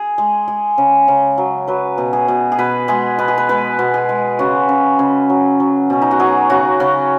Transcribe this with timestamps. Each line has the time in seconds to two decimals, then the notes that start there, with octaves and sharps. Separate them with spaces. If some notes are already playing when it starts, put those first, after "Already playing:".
Already playing: G#4
0.18 G#3
0.48 G#3
0.78 C#3
1.08 C#3
1.38 F#3
1.68 F#3 B4
1.98 B2
2.13 G#4
2.28 B2
2.52 G#4
2.59 B2 B4
2.88 G#3 G#4
3.18 B2 B4
3.28 G#4
3.38 B4
3.49 G#3 B4
3.79 B2
3.94 G#4
4.09 G#3
4.39 C#3 F#4
4.69 C#3
4.99 C#3
5.30 F#3
5.60 F#3
5.90 B2 C#4
6.02 D#4
6.11 F#4
6.19 F#3 G#4
6.50 C#3 F#4
6.80 C#3 C#4